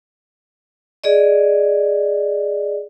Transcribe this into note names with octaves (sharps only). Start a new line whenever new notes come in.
G#4 D5 D#5